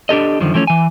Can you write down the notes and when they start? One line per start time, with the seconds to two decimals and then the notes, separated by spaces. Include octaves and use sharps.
0.09 D4 G4 A4 D#5
0.40 F#2 D3 D#3 F3
0.54 E3 F3 A3 C4 C#4
0.67 E3 G#5